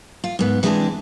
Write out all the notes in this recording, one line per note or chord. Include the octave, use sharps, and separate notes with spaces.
F4
G#2 B3
E3 G#3 B3 C4 D4 G#4